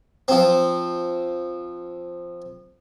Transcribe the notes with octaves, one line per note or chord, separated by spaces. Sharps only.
F3 C4